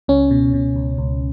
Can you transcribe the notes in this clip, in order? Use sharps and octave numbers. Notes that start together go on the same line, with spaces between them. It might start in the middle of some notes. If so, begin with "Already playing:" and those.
C#2 C#4
B2
B2
C#2
C#2